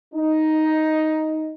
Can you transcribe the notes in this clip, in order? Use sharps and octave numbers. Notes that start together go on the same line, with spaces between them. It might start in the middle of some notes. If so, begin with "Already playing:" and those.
D#4